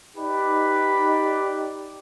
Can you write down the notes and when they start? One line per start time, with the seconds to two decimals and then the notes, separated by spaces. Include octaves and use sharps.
0.18 D#4 G4 B4 D5